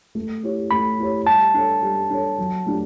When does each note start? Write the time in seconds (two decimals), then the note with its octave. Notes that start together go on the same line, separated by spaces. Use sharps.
0.15 A3
0.43 E4 G4 C#5
0.71 A3 B5
0.99 E4 G4 C#5
1.27 G3 A5
1.54 D4 A4 C#5
1.82 G3
2.10 D4 A4 C#5
2.39 F#3
2.66 A3 D4 G4